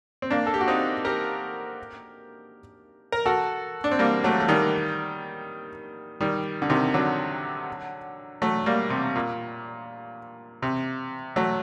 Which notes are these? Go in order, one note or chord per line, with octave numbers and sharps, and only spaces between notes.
C4
A#3 D4
A4
G4
F#4
C4 D#4
G4 A#4
A#4
F#4 A4
D4
C4
G3 A#3
F#3 A3
A3
D#3 G3
D#3 G3
D3
C3 D#3
D3 F#3
F#3 A3
G3 A#3
C3
A#2
C3
F#3 A3